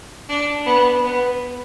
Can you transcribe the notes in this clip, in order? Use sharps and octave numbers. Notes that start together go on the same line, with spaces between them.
D4
B3
B3